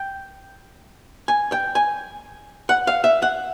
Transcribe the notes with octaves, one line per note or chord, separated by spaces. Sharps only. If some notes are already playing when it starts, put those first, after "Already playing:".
Already playing: G5
G#5
G5
G#5
F#5
F5
E5
F#5